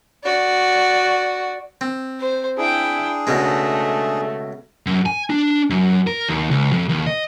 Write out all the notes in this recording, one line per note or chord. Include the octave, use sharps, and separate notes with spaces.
F#4 D5
C4
C5
D4 E4 G#4 G5
C#2 B2 G#3 A3
F#2
G#5
D4
F#2
A#4
D#2
C#2
F2
D#2
D#5